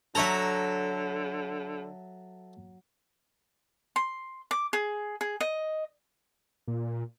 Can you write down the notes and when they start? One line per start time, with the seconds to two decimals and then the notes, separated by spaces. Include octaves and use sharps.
0.15 D3 F#3 A4 C#5 E5 A#5
3.96 C6
4.51 D6
4.73 G#4
5.21 G#4
5.41 D#5
6.67 A#2